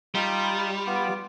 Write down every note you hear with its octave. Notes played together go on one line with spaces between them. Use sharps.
G3 D#4 F4
B3 F4 D6